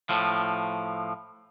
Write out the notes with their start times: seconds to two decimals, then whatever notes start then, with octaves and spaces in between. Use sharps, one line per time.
0.09 A2 F3